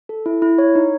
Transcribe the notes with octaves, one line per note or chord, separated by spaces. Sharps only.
A4
E4
E4
C#5
D#4